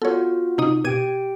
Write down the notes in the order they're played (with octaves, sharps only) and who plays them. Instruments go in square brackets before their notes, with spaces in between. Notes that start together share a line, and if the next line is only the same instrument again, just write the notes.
[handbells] B3 F4 F#4 [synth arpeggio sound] A4 C#5
[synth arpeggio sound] C3 D#4 D#6
[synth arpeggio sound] B2 G#6 D#7 [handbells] G4 G5